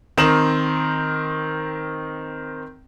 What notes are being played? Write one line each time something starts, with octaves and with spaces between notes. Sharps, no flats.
D#3 C4 A#4 D#6 E7 F#7